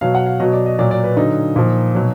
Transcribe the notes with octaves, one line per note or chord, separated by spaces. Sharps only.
B2 F#3 F5
F#5
F5
B2 F#3 D#5
D5
D#5
A#2 F#3 D5
D5
B4
D3 F#3 D#4
A#2 F3
B2 F#3